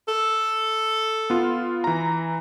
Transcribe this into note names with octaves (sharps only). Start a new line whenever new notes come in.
A4
B3 F4
E3 A#5